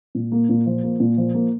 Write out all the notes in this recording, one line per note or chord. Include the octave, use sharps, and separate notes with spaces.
A#2
A#3
A#2
F3
A#3
A#2
F3
A#3